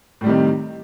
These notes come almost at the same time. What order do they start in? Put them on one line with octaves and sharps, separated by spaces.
A2 G3 C3 D#3